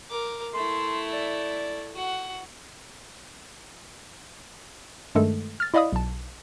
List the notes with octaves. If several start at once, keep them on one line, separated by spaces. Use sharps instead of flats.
A#4 D6
A3 E4 C6
D5
F#4 F#5
G2 D#3 G#3 A3 A4
F6 A6
E4 D5 D#5 F5 B5 D#6
B1 A5